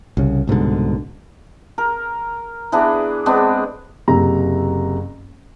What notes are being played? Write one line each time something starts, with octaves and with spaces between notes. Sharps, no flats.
C2 C#3
C2 G#2 B2 D3
A#4
E3 B3 D4 G#4
G#3 B3 C4 D4
F#1 C3 A#5